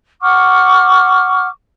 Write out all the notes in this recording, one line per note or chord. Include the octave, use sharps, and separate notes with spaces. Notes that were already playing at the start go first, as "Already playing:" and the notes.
F#5 C#6 D6 F6